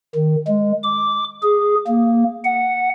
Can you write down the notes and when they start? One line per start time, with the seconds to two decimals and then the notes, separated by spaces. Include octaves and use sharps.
0.15 D#3
0.47 G#3
0.83 D6
1.43 G#4
1.87 A#3
2.44 F#5